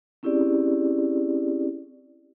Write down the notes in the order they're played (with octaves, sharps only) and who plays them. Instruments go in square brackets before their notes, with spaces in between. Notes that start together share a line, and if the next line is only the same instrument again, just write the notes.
[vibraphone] C4 C#4 E4 G4 G#4 D5